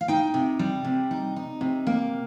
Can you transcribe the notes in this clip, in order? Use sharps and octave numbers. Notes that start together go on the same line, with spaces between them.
F5
D#4 G5
C3
G3
C3
D#4
D#4
C3
A#3